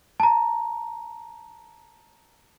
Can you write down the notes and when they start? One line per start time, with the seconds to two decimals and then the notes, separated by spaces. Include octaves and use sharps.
0.20 A5 A#5